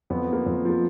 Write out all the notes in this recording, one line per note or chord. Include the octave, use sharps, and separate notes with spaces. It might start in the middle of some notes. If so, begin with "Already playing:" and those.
F2 B3
F3 A#3
F2
F3 A#3